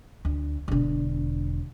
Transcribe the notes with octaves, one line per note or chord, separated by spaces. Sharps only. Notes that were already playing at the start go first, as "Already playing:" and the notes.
D2
E1 D3